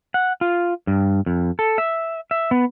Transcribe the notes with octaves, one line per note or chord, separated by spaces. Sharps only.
F#5
F4
G2
F2
A4
E5
E5
B3